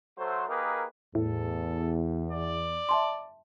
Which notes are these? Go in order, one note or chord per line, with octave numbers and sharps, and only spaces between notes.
F#3 A3 C5
A#3 D#4 G4 G#4 A#4 B4
E2 A2 A4
D5
E5 A5 C6